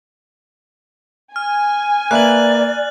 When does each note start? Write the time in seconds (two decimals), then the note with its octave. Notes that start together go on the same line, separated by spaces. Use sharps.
1.36 G#5 F6
2.11 A#3 B4 D5 E5 F#6 F#7